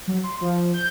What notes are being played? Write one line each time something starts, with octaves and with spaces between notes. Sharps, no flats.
F#3
C6
F3
G6